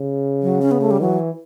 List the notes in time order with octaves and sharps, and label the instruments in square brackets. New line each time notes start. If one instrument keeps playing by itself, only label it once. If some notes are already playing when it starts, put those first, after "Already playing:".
Already playing: [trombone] C#3
[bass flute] F#3
C#4
B3
A3
G3
[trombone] E3 [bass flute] F#3